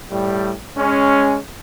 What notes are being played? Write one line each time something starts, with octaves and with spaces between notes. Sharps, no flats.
A2 G3
G#3 C#4